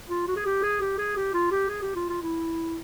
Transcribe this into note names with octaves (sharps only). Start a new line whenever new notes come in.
F4
F#4
G#4
G4
G#4
G4
G#4
G4
F4
G4
G#4
G4
F4
F4
E4